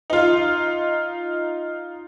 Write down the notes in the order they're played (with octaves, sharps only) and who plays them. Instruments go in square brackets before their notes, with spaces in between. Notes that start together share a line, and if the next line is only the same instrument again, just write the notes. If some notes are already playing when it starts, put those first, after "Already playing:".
[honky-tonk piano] D#4 F4